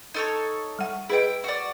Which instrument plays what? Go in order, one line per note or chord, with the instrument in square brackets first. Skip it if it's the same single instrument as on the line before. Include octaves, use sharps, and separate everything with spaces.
[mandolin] D#4 A4 C#5
[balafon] G3 F#5
[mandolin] E4 G5 [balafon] G#4 B4 D#5
[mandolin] F#4 D5